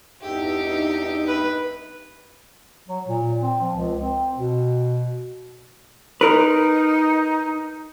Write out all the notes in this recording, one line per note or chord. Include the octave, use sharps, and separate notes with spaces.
E2 G2 D#4 G4 E5
B4
F#3
A#2
C4
F3
C#2
C4
B2
D#4 A#4 B4